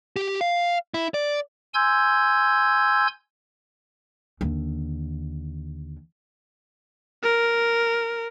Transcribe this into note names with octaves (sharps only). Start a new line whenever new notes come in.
G4
F5
E4
D5
G#5 C6 E6 G6 G#6
D#2 D3
A#4